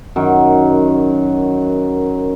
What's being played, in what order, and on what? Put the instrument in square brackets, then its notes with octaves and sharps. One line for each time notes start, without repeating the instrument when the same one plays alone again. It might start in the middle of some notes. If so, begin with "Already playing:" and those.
[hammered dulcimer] F#2 D#3